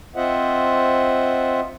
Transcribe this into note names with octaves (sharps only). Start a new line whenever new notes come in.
C4 F4 C5 D#5 E5 F#5